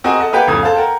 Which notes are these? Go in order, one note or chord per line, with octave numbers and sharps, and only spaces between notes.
C4 F#4 G#4 A#4 D#5 G#5
A4 D#5 F#5
A#3 G4 B4 F#5 G5
F1 C#2 A2 D#6 G#6
A4 C5 F5
A#4 F#5 G5